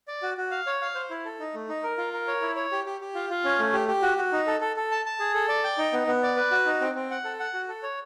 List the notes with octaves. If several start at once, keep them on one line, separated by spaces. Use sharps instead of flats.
D5
F#4
F#4
F5
C#5
F5
C5
E4
A4
D#4
A3
D#4
A#4
F4
A#4
C#5
E4
C#5
G4
G4
G4
F4
F4
C#4
A3
G4
G4
F#4
F#4
D#4
A4
A4
A4
A5
A5
G#4
A4
D5
G5
D#4
B3
B3
D5
B4
F#4
D#4
C4
C4
F#5
A4
F#5
F#4
A4
C#5